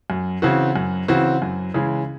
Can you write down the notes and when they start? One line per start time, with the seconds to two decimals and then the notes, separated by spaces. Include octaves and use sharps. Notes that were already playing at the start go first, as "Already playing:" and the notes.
0.10 F#2
0.42 C#3 E3 C4 F#4
0.76 F#2
1.08 C#3 E3 C4 F#4
1.42 F#2
1.74 C#3 E3 G#3